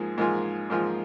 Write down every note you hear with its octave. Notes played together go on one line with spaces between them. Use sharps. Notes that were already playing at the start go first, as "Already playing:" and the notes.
Already playing: G#2 F3 A#3 G#4
G#2 F3 A#3 F4 G#4
G#2 F3 A#3 F4 G#4